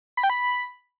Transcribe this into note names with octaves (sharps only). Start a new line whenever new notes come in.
B5
G5
B5